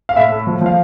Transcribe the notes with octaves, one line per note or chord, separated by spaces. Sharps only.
F5
A2 E5
A3
F3
F3 F5